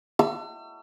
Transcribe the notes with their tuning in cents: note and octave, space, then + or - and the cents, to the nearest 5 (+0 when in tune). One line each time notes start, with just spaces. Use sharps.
E6 +40